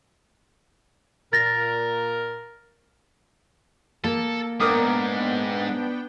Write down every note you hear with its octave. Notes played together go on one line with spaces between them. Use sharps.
A#2 A#4 A6 A#6
A#3 A4
G#2 B3 D4 A#4 G5 D6 D#6